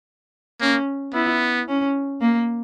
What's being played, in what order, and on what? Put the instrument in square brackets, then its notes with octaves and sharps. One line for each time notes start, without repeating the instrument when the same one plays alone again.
[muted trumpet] A#3 [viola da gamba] C#4
[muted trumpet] B3 [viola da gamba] E4
[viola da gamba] C#4
A#3